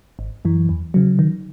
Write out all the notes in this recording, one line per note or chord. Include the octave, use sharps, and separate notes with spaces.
G#1
F#2 E3
E2
C#3 F#3
D#3